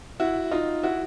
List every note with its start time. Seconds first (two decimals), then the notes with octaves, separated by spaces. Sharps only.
0.20 E4 F#4
0.51 D#4 F4
0.83 E4 F#4